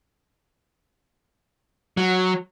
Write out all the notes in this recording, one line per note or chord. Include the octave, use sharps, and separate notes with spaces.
F#3